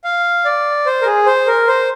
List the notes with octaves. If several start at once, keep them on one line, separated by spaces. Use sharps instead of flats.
F5
D5
C5
A#4
G#4
C5
A#4
C5